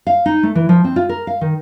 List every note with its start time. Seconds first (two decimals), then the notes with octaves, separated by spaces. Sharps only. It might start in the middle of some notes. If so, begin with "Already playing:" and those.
0.07 F5
0.26 D#4
0.43 A3
0.55 E3
0.69 F3
0.84 C4
0.96 F4
1.09 A#4
1.27 F5
1.41 D#3